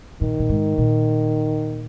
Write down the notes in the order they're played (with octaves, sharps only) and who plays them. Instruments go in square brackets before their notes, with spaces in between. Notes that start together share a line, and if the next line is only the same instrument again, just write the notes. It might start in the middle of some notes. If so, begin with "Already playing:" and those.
[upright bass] A#2 [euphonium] D#3
[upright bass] A#2
G#2
A#2